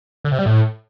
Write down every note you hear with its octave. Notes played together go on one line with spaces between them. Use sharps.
D3
C3
G3
A2